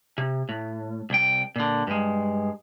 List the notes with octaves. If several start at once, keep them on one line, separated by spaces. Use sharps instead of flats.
C3
A2
C2 G5
A#2 D3
G2 G#3